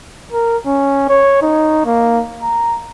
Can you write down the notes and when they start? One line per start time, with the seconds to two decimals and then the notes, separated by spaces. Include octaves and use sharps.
0.32 A#4
0.66 C#4
1.09 C#5
1.42 D#4
1.85 A#3
2.42 A#5